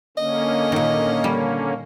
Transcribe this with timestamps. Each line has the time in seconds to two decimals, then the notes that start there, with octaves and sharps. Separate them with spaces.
0.17 D3 A#3 C#4 D#5
0.72 A#2 D#3
1.24 G3